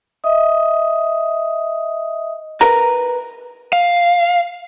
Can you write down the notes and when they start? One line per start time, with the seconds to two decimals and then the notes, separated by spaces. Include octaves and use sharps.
0.24 D#5 E5 D#6
2.61 A#4 B4 A#5
3.73 F5